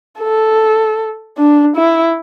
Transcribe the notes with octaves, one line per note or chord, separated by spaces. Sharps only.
A4
D4
E4